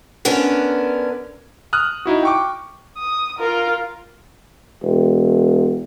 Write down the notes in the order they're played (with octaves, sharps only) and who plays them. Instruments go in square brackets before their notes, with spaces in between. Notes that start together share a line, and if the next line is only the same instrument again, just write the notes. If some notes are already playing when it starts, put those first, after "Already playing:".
[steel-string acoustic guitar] D3 B3 C#4 D4 A#4
[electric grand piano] D#6 F6 F#6
D#4 E4 F#4
G5 C#6 D6
[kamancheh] D#6
F4 A#4
[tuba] E1